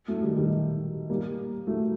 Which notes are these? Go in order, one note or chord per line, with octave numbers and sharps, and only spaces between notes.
F#3 A3
D#3 G3
D#3 G3
G3 A#3
F#3 A3